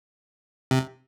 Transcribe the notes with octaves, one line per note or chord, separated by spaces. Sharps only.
C3